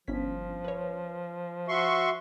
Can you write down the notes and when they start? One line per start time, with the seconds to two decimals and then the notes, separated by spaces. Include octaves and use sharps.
0.08 G1 F3 C#4 B6
0.64 B4 C#5
1.68 F#4 E5 C6 C#6